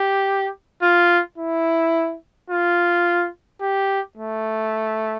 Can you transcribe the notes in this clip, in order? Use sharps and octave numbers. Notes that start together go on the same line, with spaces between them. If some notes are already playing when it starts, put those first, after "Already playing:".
Already playing: G4
F4
E4
F4
G4
A3